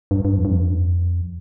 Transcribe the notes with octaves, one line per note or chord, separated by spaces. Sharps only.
G2
G2
F2
G2
F2